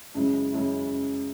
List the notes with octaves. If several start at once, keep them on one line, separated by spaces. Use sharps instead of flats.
F#2 C#3 G#3 C#4 E4
F#2 C#3 G#3 C#4 E4